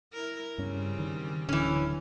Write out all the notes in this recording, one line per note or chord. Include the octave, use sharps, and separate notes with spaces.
E4 A#4
G2 C#3 G3 C4 C#4
D#3
D1 D3 E3 C#4